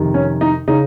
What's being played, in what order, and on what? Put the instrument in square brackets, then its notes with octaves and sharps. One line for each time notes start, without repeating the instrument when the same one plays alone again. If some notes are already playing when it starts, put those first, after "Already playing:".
Already playing: [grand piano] F2 C3 D#3
C#4
D#4
C#3 D#4